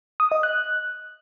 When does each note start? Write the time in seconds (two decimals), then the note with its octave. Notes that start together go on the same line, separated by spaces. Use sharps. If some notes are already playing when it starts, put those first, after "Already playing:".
0.20 D#6
0.32 D#5
0.43 F#6